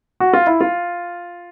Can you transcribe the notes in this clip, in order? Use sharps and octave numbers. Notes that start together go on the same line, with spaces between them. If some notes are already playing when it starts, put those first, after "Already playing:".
F#4
F4
E4
F4